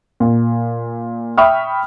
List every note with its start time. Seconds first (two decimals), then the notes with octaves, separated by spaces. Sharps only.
0.20 A#2
1.38 E5 G5 B5 C#6 D#6 F6